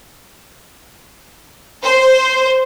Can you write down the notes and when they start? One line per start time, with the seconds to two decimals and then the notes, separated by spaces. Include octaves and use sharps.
1.83 C5